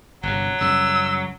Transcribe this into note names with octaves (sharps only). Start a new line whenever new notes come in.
G1 G2 C3 F#3
F#2 C#3 G3 E6